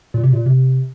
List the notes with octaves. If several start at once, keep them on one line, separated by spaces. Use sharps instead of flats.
A#2
C3
A#2
C3